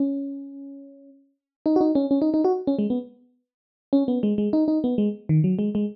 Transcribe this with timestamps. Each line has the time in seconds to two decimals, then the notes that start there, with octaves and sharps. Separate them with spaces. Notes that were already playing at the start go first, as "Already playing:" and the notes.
Already playing: C#4
1.66 D#4
1.76 F#4
1.81 D#4
1.95 C#4
2.11 C#4
2.22 D#4
2.34 D#4
2.44 F#4
2.67 C#4
2.79 G#3
2.90 B3
3.93 C#4
4.08 B3
4.23 G#3
4.38 G#3
4.53 D#4
4.68 D#4
4.84 B3
4.98 G#3
5.29 D#3
5.44 F#3
5.59 G#3
5.75 G#3